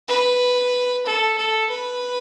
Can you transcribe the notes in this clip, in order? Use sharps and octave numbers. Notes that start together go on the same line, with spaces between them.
B4
A4
A4
B4